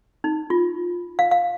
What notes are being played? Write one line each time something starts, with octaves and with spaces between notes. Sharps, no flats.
D#4
F4
F5
F5